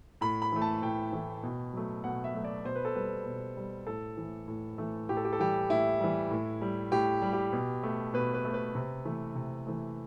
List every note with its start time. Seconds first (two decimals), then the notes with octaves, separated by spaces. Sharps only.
0.21 A2 B5
0.42 B5
0.52 E3 A3
0.62 A5
0.82 A2 G5
1.13 E3 A3
1.43 B2
1.73 F#3 A3
2.04 B2 F#5
2.24 E5
2.34 F#3 A3
2.44 D5
2.65 B2 C5
2.75 B4
2.85 A4
2.95 G3 B4
3.26 B2
3.57 G3
3.87 A2 A4
4.17 E3
4.23 A3
4.48 A2
4.78 E3 A3
5.09 A2 G4
5.17 A4
5.25 G4
5.33 A4
5.40 E3 G3 G4
5.70 A2 E4
6.01 E3 G3
6.31 A2
6.62 G3
6.92 A2 G4
7.22 G3
7.33 G4
7.53 B2
7.83 A3
8.14 B2 B4
8.34 B4
8.45 A3
8.54 B4
8.75 C3
9.05 E3 A3
9.35 C3
9.67 E3 A3